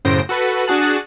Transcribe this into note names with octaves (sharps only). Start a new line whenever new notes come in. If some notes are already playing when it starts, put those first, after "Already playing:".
F#2 A2 C#3 C5 A#6 D7
F#4 A4 B4
D4 F#4 G#4 A5 F#6